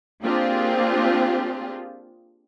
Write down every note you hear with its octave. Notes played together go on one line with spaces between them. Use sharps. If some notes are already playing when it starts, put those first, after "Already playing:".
A#3 C4 D4 F4 G4 G#4